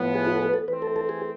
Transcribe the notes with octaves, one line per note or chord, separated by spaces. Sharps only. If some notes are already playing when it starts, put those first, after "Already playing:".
Already playing: A2 F3 B3
G#4
F4
A4
G#4
B4
A4
E3 A3 C4 B4
A4
A4
G#4